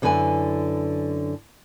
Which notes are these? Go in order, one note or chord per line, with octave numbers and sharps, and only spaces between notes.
F#2 D3 E4 B4 G#5